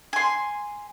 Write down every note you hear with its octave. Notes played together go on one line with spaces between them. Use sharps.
G#5 C6